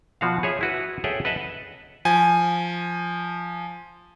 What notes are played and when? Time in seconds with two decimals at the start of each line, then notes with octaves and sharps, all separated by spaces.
0.21 B2 F3 F#4 F5
0.43 G#4 C#5 E5
0.61 E4 F#4 B4
1.04 G#4 A4 C#5 E5 F#5 G5
1.25 B4 D#5 E5 F#5 A5
2.05 F3 G#5